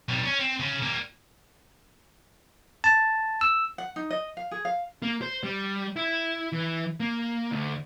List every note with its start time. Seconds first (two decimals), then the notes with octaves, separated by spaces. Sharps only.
0.08 B1 G3
0.25 C#4
0.40 C4
0.60 C#3
0.83 G3 A#3
2.84 A5
3.41 E6
3.78 F#5
3.96 D#4
4.11 D#5
4.37 F5
4.51 G#4
4.65 F5
5.02 A#3
5.22 C5
5.43 G3
5.96 E4
6.52 E3
7.00 A#3
7.51 D2